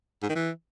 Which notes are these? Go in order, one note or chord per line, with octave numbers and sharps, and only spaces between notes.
G#2
D#3
E3